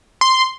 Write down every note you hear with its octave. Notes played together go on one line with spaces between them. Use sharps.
C6